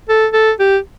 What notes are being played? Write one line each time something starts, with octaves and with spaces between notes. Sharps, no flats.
A4
A4
G4